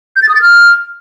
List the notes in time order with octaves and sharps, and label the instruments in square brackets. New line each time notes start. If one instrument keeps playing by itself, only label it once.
[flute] G6
A6
D#6
A6
F6